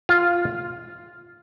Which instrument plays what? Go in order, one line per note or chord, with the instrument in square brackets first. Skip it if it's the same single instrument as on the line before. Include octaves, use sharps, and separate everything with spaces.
[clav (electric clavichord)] F4